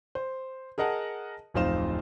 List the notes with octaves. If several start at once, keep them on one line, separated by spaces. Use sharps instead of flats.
C5
G#4 A#4 D#5 F#5 A5
D1 F2 D#4 F4 C5 E7